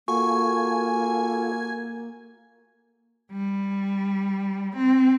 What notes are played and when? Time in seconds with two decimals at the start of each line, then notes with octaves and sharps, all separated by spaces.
0.08 A#3 F4 F#4 A4 G#5 C#6
3.31 G3
4.76 C4